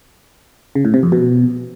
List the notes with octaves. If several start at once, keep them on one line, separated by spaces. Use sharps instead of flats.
C#3
A2
C3
F2
B2